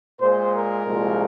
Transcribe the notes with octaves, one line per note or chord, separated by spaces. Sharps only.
A#2 G#3 C5
A#4
C2 A#2 F3 G#3